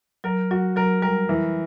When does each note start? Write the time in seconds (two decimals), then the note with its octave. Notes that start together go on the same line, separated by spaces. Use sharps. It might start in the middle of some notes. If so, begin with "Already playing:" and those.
0.24 F#3 A#4
0.51 F#3 F#4
0.76 F#3 A#4
1.02 G3 A#4
1.29 E3